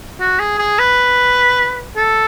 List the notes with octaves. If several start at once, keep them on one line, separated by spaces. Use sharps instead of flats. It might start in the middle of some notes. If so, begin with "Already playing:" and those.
F#4
G#4
G#4
B4
A4